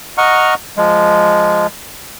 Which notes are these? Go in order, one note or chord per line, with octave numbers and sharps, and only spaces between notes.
D#5 F#5 A#5 C#6 F6
F3 G#3